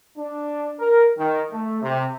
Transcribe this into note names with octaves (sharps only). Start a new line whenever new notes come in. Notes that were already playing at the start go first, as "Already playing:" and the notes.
D4
A#4
D#3
A3
C3